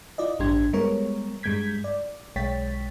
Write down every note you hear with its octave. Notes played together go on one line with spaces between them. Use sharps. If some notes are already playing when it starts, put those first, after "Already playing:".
E4 F4 D5 D#5
A1 G2 D4 G4 C6 G#6
G3 G#3 B3 A#4 C#5
G2 G3 G#3 G6 G#6 B6
D5
B1 G#3 C#5 G5 A6 B6